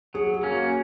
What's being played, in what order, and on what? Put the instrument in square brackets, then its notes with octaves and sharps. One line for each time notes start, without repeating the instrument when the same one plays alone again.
[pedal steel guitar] F#3 [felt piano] G#4
[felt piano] G#4
[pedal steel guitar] A#3 C#4
[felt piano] F#4